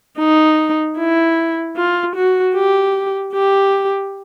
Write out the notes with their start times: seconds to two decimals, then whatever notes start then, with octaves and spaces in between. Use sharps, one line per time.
0.19 D#4
0.98 E4
1.76 F4
2.16 F#4
2.55 G4
3.34 G4